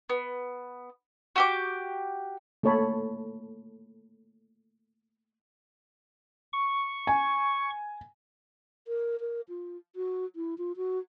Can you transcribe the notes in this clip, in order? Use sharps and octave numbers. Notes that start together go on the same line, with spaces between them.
B3
F#4 G4 D6
A3 A#3 A4 C#5 A5 B5
C#6
G#5
A#4
A#4
F4
F#4
E4
F4
F#4